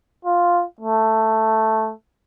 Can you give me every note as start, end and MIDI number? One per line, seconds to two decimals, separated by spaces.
0.25 0.64 65
0.80 1.93 57